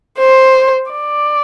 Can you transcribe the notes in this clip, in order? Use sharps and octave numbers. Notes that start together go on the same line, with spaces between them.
C5
D5